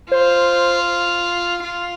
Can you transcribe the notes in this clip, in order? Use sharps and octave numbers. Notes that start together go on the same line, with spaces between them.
F4 C5
F4